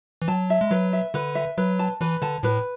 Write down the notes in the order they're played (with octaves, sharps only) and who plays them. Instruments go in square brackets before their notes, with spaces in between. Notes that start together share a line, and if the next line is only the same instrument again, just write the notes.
[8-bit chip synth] E3
[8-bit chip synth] F#3 [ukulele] A5
[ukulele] E5
[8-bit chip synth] G#3
[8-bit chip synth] F#3 [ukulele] B4
[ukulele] E5
[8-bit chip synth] D3 [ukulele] B4
[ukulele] E5
[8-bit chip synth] F#3 [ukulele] B4
[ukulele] A5
[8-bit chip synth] E3 [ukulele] B4
[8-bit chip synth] D3 [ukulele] A5
[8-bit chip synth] A2 [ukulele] B4